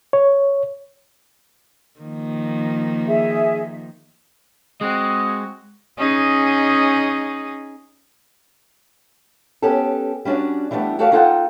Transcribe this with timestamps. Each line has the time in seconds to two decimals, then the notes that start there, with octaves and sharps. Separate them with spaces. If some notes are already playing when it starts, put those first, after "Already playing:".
0.13 C#5
2.00 D#3 F3 A#3
3.07 G#4 E5
4.81 G#3 C4 F#4 D#5
5.98 C#4 D#4 G#4
9.62 B3 C#4 G4 A4
10.25 G3 C#4 D4 F#4 D5
10.71 E3 G3 A3 B3 D4
10.99 A3 F#4 G4 A4 D5 F5
11.12 A#3 D#4 F4 A4 F#5 G5